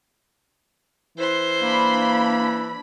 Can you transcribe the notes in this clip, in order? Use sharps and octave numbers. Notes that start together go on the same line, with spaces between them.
E3 C5 C6
A#3 D4 B5